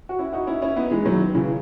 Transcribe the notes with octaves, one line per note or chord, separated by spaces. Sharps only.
F#4
C#4 E4
D#4 F#4
C#4 E4
C#4 E4
B3 D#4
E3 G#3
D#3 F#3
C#3 E3